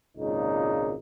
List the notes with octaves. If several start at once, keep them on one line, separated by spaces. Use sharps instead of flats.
G#1 C#2 A#2 D#4